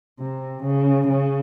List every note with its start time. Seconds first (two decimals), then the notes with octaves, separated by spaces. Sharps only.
0.20 C3
0.64 C#3
1.08 C#3